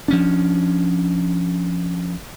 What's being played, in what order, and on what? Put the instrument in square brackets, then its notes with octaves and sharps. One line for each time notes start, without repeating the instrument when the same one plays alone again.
[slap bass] F3 C#4 D4